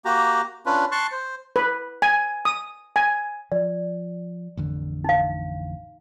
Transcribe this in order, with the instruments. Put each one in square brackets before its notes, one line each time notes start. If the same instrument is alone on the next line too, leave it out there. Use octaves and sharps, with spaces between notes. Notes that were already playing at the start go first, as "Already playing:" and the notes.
[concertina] A#3 F#4 G4 A#5
C#4 D4 F4 B4
A5 C6 C#6 F#6
C5
[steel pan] B4
G#5
D#6
G#5
[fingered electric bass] F3 [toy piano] D5
[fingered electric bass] A1 F2 D3
[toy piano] D#4 F5